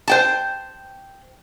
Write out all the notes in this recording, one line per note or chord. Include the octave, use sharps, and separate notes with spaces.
C5 G5 A5